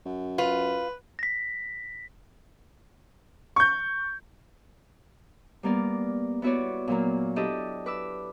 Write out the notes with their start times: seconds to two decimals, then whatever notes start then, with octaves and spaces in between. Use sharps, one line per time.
0.05 F#2
0.38 F4 B4
1.19 A#6 B6
3.56 C#6 G6
5.63 G3 A#3 B3 A#4 D5
6.42 B3 E4 F#4 C#5 D5
6.88 A#2 F#3 A#3
7.36 D4 E4 G4 A4 D#5
7.86 B4 D6 E6